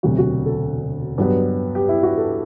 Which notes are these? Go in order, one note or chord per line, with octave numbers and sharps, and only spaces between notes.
E1 D2 C3 F#3 F#4
F#4
A4
G2 F#3 B3
G4
E4
F#4
A4